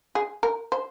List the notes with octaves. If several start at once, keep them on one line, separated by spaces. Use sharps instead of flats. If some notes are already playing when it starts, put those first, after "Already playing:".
G#4
A#4
C5